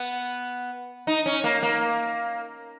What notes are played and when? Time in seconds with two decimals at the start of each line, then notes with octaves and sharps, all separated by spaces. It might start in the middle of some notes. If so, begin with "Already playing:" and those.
Already playing: B3
1.07 D#4
1.26 C#4
1.44 A#3
1.63 A#3